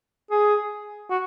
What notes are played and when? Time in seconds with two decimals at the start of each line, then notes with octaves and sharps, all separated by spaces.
0.31 G#4
1.10 F#4